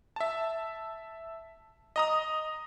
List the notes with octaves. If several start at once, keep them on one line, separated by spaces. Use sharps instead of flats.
E5 A5
D#5 A#5 D#6